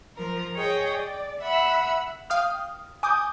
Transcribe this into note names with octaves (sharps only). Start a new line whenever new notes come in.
F3 A#4
G#4 C#5 D#5 G5
D5
E5 F#5 B5 E6
F5 G5 D#6 F6
G#5 D6 D#6 G6